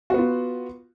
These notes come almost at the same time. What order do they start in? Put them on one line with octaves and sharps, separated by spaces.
F#4 B3 F4